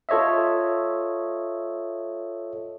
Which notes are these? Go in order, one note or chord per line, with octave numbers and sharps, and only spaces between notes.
F4 A4 C#5 D#5 E5